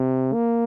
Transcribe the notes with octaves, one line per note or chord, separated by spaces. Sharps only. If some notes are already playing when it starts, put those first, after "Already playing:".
Already playing: C3
A#3